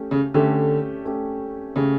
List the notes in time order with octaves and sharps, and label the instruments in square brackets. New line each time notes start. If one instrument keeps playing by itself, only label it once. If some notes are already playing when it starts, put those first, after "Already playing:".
Already playing: [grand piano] A3 C#4 G4
[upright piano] C#3
[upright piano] D3 [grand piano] A3 C#4 G4
[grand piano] A3 C#4 G4
[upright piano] C#3 [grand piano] A3 C#4 G4